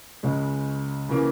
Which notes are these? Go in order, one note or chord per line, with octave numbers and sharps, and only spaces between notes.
C#2 C#3 G#3
C#3 E3 A#3